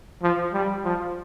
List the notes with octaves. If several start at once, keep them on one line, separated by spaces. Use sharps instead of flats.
F3
G3
F3